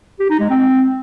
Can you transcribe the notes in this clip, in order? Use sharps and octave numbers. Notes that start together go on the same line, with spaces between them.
G4
D#4
G#3
C4